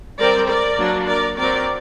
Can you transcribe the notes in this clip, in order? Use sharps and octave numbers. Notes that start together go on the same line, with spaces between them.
G3 C4 A#4 D5
A#4 D5
F#3 A#3 D4
A#4 D5
F#3 C4 A#4 D5